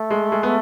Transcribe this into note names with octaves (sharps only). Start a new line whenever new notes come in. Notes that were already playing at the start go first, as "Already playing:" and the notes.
Already playing: A3
G#3
G#3
B3